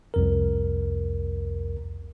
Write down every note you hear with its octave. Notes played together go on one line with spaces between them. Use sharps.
C2 F2 A#4